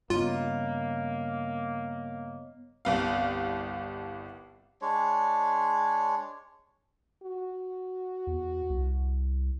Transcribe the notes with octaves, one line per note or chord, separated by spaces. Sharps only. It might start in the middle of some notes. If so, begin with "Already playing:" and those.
G2 C#3 A#3 B3 F4 C#5 D#5
G1 C2 F5
G#3 D4 C#5
F#4
E2
C2